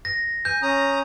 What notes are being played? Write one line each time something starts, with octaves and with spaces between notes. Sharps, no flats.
A#6
G#5 G6
C#4 A#5 D#6